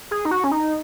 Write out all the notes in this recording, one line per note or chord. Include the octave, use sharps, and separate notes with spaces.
G#4
D#4
F#4
C#4
D#4